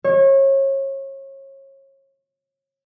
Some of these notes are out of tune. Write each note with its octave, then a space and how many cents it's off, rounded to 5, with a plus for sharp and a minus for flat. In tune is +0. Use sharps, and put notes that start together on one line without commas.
C#5 -30